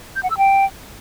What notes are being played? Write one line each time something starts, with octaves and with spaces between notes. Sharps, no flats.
G6
F#5
E6
G5